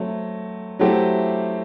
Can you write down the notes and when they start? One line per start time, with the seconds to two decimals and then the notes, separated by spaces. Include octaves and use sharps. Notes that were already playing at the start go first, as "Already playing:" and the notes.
Already playing: F#3 A3 C4
0.79 F#3 A3 C4 E4 G4